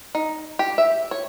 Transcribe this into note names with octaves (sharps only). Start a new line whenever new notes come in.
D#4
G4
E5
C#5